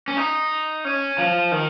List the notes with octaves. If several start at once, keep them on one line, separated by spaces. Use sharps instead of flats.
C#4
D#4
C#4
F3
D#3